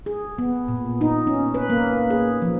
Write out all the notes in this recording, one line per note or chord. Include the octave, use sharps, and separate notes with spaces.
G#4
B3
A#2
D#4
C#4
B4
A#3
G#4
F3